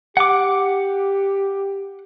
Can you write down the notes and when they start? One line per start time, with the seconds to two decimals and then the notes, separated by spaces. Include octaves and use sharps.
0.17 G4 F#5 D6